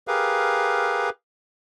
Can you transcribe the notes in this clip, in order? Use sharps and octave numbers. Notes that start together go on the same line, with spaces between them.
G4 G#4 A#4 B4 F5